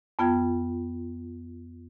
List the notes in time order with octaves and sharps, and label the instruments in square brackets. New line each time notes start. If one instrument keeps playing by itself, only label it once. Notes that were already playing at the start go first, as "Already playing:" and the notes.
[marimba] F2 B3 F4 G5 G#6